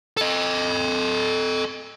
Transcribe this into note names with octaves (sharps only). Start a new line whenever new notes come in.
A4 D#5